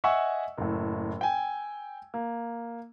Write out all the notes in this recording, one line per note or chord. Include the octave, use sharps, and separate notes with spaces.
D#5 E5 F#5 G#5 C#6 E6
F#1 A2
G5 G#5
A#3